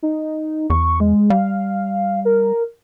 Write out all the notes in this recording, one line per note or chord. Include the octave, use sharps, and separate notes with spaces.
D#4
E2 C#6
G#3
G3 F5
A#4